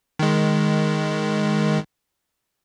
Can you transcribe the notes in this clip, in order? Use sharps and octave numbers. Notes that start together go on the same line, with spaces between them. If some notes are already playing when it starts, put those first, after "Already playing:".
D#3 G#3